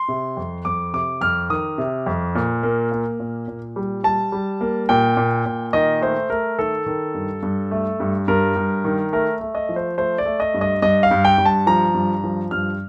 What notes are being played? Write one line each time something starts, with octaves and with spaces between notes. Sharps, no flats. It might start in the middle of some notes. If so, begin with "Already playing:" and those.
Already playing: C6
C3
F2
F2 D6
C3 D6
F2 F6
D#3 D#6
C3
F2
A#2
A#3
A#3
A#2
A#2
G3
G3 A5
G3
A#3
A#2 G5
A#2
A#2
D#3 D#5
A3 C5
A3 A#4
D#3 A4
D#3
G2
G2
A3
G2
G2 A#4
G2
D#3
A3 A#4
A3
D#5
F3
C5
A3 C5
D5
A3
D#5
G2
D#5
G2 D#5
F5
G2
G5
G2
A5
F3 A#5
G2
F3
G2 F6